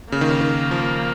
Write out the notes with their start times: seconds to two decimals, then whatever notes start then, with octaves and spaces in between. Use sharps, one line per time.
0.12 C#3 A#3
0.21 D#3
0.30 C#3
0.41 D#3
0.71 F3